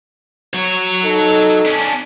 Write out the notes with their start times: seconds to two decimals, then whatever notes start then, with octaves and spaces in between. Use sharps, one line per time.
0.53 F#3 C#5
1.05 D#4 A4
1.65 C#4 D4